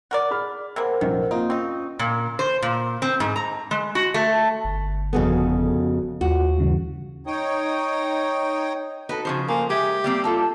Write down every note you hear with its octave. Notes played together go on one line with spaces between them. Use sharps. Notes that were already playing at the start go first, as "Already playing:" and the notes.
F#4 A#4 D5
G#4 B5 F6
C3 E3 A#3 A#4 C5 F#5
F1 A#1 F#2 D#3
A#3 C4 D#4 F4
C4 C#4 D#4
A#2
C5
A#2
C4
G#2
A#5
G#3
F#4
A3
G1
F2 C#3 B3 F#4 G#4 A4
D#2 F4 F#4
G2 C#3 E3
D#4 C#5 G5 D#6
D#4 F#4 A4 B4
C#3 F3 C5
A#3 G#5 A#5
G#3 G4 E5
G3 A#3 C4
D#4 F4 A4 A5